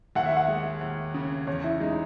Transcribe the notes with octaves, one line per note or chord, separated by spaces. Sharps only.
D#2 F#5
E5
F#5
G#3
D#2
C#3
E2 C#5
E4
G#3 D#4